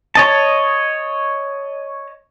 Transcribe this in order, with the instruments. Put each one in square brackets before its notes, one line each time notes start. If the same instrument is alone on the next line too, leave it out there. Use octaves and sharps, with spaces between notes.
[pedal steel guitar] C#5 D#5 A5